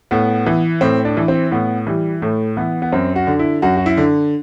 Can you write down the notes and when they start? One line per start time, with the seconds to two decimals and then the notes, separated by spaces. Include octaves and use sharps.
0.11 A2 B3
0.46 E3
0.81 A2 C4
1.05 D4
1.17 E3
1.28 C4
1.52 A2 B3
1.87 E3 G3
2.22 A2 A3
2.57 E3 B3
2.82 B3
2.92 F#2 C4
3.16 F#4
3.27 D3
3.39 E4
3.62 F#2 F#4
3.77 F#4
3.86 E4
3.97 D3